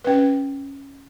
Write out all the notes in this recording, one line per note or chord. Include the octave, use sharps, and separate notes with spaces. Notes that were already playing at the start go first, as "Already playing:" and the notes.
C#4 B4